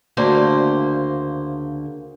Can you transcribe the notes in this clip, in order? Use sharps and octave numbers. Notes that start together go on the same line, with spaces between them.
D2 C#3 A#3 C5 D5